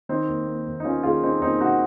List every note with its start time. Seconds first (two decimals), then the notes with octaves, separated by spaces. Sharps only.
0.09 D#3 C4 D#4
0.28 D#2
0.47 A#3
0.67 D#2
0.80 D#4
0.85 D#3 C#4 F4
1.03 D#2 F4 G#4
1.23 A#3 C4 D#4
1.41 D#2 C4 D#4
1.60 D#3 D#4 F#4